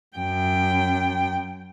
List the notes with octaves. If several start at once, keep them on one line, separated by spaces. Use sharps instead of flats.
F#2 G5